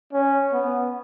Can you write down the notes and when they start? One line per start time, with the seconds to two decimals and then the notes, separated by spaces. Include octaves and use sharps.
0.13 C#4
0.52 B3